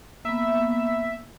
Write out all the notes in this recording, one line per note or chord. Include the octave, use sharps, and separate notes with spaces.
A#3 B3 E5